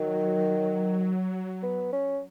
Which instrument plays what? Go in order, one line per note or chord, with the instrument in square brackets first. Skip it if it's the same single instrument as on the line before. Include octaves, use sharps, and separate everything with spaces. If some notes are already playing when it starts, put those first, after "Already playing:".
Already playing: [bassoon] D#3 [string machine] F#3
[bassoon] B3
C#4